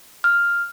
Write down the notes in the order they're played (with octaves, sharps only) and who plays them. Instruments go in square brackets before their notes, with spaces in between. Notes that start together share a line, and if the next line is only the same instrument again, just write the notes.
[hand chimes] F6